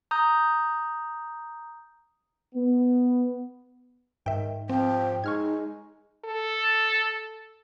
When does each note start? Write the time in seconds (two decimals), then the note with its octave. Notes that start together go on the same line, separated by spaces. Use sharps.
0.11 A#5 D#6 G6
2.55 B3
4.26 G#2 D#3 E5 G5
4.70 F3 C4 G5
5.24 G#3 D#4 C#6 F6 G#6
6.25 A4